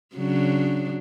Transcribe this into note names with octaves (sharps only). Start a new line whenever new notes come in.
C#3 F#3 D4